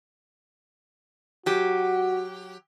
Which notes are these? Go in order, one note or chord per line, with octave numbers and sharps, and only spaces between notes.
F#3 F#4 G4